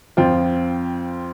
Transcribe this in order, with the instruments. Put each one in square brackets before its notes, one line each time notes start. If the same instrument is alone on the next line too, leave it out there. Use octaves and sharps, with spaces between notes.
[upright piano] F2 F3 C4 F4